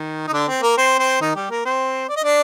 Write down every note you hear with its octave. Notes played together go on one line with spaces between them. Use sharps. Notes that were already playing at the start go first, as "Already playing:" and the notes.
Already playing: D#3
D#4
D3 D4
C4
A#3 A#4
C4 C5
C4 C5
D#3 D#4
G3 G4
A#3 A#4
C4 C5
D5
D#5
D4 D5